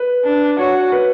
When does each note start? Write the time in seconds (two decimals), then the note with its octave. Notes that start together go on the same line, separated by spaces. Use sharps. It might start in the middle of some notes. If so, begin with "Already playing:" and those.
Already playing: B4
0.24 D4
0.59 F#4 C#5
0.92 B4